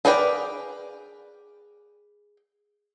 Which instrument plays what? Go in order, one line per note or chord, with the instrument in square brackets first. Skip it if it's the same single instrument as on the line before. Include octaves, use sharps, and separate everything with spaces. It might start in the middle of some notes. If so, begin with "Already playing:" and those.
[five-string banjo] G#4 A#4 B4 D5 G5